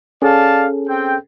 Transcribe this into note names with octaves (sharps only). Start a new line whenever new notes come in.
C#4 G#4 A4 D5 F5 A5
C4 G5